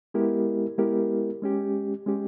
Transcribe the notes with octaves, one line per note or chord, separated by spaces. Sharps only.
G#3 B3 E4 G4 A#4
G#3 B3 E4 G4 A#4
G#3 C#4 G4
G#3 C#4 G4